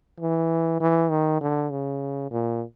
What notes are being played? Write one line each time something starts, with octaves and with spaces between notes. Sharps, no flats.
E3
E3
D#3
D3
C#3
A#2